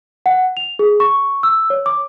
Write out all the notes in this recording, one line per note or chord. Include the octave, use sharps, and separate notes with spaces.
F#5
F7
G#4
C#6
E6
C#5
D6